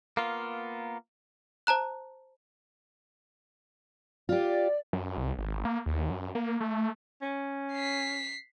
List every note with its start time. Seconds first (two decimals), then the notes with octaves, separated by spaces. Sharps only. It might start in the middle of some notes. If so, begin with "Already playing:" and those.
0.17 A#3 B3 F4
1.67 C5 A5 A#5 F#6
4.29 F4 G4 D5
4.93 F#2
5.17 C2
5.38 G#1
5.65 A#3
5.86 D#2
6.10 F#2
6.35 A#3
6.60 A3
7.22 C#4
7.73 B6 C7